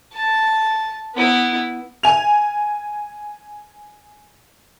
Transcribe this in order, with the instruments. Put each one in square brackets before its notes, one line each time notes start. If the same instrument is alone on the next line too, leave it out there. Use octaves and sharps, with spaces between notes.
[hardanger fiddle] A5
B3 E4
[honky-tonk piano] G#5 F7